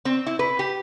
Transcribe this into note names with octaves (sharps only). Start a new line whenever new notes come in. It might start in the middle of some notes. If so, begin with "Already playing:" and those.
C4
E4
B4
G4